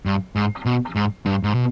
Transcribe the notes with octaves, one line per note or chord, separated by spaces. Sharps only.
G2
G#2
B2
G#2
G2
G#2
B2